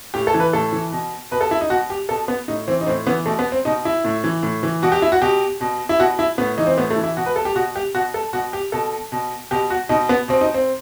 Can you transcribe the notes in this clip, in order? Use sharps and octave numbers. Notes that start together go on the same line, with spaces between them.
A2 G4
A4
E3
B4
A2 A4
E3
B2
B2 B4
A4
E4
D#4
B2 F#4
G4
B2 A4
B3
A2 D#4
E3 C4
D#4
A2 C4
E3 B3
B2 A3
B3
C4
B2 D#4
E4
A2
E3
A2
E3
B2 F#4
G4
E4
F#4
B2 G4
B2
E4
B2 F#4
E4
A2 B3
E3 D#4
C4
A2 B3
A3
E3
E4
B2 F#4
B4
A4
G4
B2 F#4
G4
B2 F#4
A4
B2 F#4
G4
B2 A4
B2
B2 G4
F#4
B2 D#4
B3
B2 C4
D#4
C4